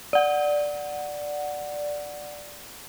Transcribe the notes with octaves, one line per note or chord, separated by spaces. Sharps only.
D5 F#5